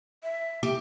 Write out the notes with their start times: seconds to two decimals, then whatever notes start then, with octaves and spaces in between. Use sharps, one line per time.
0.23 E5
0.63 G4